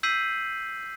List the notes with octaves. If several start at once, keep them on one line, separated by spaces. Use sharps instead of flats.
E6 G6 B6 C7 D#7 F#7